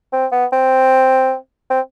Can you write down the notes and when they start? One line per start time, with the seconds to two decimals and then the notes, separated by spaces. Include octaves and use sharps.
0.13 C4
0.32 B3
0.53 C4
1.70 C4